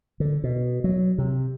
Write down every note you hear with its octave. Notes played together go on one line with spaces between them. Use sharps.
D3
B2
F#3
C3